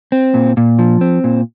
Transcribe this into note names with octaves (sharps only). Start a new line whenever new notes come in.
C4
A#2
A#2
F3
C4
A#2